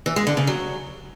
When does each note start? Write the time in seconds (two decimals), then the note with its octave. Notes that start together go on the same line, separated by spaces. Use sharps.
0.06 E3
0.16 G#3
0.27 D3
0.37 C#3
0.47 F#3